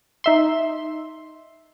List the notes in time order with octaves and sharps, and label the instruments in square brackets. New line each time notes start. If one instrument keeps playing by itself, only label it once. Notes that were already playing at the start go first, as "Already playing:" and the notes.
[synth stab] D#4 E5 C6